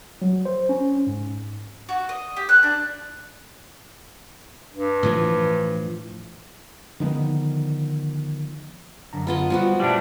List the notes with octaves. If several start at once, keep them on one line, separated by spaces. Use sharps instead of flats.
F#3
C5
C#4
G#2
F#4
D#5
G4
F#6
D4
G2
A2 E3 F3
D3 D#3 F3 B3
F#2 D3 A#5
B3 F4 D#5
F3 G3 B3 F#4
B2 G3 A3 D4 E4